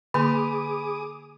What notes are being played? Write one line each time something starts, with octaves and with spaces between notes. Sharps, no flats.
D3 A#3 G#4 B5 C6 D6 D#6